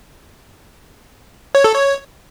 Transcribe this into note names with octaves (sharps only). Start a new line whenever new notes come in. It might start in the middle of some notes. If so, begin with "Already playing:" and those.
C#5
A4
C#5